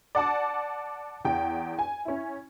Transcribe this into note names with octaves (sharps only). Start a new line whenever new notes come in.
D5 F#5 A5 D6
E2 G5
G#5
C#4 E4